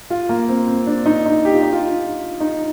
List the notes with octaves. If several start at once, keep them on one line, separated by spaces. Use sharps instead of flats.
F4
A#3
C4
C4
D4
D#4
D#4
G4
F4
D#4
F4
D#4